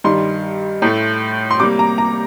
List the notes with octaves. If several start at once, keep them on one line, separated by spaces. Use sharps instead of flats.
G2 D#3 G3 C6
A2 A3
C6
C3 G3 A#3 D6
A#5
A#5